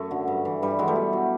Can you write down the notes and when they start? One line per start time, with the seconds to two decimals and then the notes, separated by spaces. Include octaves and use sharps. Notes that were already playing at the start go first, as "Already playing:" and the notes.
Already playing: F#2 A3
0.11 D3 F#3
0.28 G2
0.45 E3
0.62 G2 G3
0.79 E3 F#3 G#3
0.88 G3 A3
0.96 B2
1.13 F#3